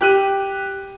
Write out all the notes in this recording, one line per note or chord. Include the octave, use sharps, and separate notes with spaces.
G4 F#6 D#7